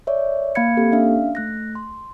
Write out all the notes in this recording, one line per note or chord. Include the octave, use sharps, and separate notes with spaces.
C#5 D5 E5
A#3 F5 B5 G#6 C#7
A#3 C4 G4 A4
C#4 D4 E5 F5
A3 F#6 A#6
C6